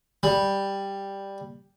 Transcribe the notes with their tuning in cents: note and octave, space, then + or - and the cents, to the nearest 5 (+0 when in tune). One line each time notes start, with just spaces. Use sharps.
G3 +5